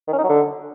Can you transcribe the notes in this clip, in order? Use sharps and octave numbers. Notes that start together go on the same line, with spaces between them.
D#3
C#4
D#4
F#3
D3